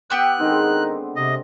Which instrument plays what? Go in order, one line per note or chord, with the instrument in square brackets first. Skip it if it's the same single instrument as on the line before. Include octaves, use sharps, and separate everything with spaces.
[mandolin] B3 G4 E6 [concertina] F#6
[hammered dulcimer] D3 G#3 C4 [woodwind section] D#3 D#4
[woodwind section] C3 [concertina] D#5